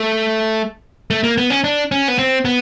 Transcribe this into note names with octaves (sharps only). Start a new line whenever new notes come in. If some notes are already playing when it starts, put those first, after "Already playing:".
Already playing: A3
A3
A#3
B3
C#4
D4
C#4
B3
C4
B3